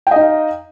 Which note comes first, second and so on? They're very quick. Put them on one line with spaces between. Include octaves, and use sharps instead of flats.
G5 D#5 D#4 F5